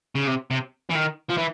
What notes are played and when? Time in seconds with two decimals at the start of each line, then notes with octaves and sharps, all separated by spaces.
0.15 C#3
0.27 C3
0.51 C3
0.90 E3
0.95 D#3
1.29 F3
1.37 E3